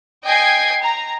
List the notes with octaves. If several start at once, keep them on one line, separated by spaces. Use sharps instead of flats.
D#5 G5 G#5 G#6 C7
A#5